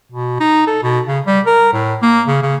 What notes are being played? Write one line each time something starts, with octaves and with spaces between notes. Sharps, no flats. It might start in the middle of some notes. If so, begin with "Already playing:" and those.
B2
D#4
A4
B2
C#3
G3
A#4
A2
A#3
C#3
C#3